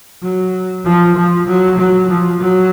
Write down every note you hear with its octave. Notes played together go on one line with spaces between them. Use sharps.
F#3
F3
F3
F#3
F#3
F3
F#3